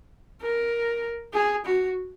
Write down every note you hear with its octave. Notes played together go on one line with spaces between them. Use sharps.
A#4
G#4
F#4